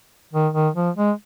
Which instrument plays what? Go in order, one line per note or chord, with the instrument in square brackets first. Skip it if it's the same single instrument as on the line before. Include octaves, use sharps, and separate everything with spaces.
[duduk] D#3
D#3
F3
G#3